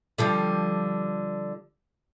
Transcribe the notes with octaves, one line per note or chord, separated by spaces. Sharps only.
D3 F3 G3